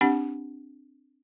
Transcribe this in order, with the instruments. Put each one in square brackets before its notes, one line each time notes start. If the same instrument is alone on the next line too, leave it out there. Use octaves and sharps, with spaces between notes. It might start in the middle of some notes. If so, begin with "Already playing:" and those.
[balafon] C4 D4 G4 F#5